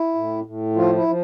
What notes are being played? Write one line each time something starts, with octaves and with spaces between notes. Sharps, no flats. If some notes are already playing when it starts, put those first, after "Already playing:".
Already playing: E4
A2
A2
F3 F4
E4
F3